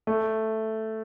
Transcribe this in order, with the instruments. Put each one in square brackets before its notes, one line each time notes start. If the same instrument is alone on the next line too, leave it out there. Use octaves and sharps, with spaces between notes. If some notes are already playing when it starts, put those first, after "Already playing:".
[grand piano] A3